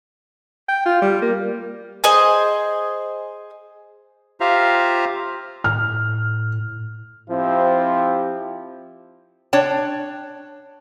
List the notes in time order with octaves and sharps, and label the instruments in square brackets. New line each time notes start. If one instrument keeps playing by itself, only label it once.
[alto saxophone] G5
F4
G3
A#3
[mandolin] G#4 C5 D#5 G#5
[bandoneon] F4 G4 C5 E5 F5 A#5
[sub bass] A2 [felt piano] F6
[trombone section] F3 C4 E4 G4
[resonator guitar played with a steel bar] D4 C#5 G5 A5